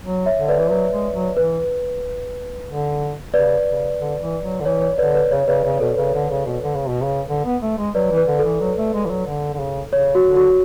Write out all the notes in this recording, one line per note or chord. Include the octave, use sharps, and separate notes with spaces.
F#3
C#5 E5
D3
B4 D5
E3
F#3 B4
G#3
F#3
E3 B4
D3
C#3 B4 D5
C#3
D3
E3
F#3
D3
E3 C#5
C#5
D3 B4 D5
B4 D5
C#3 C#5
C#3 B4 D5
C#3
B2 A4
C#3 B4
D3
C#3
B2
D3
C#3
B2
C#3
D3
B3
A3
G#3
F#3 B4 D5
E3
B4
D3
E3 A4
F#3
A3
G#3
E3
F#3
D3
D3
C#3
C#3 C#5
F#4
D3
F#4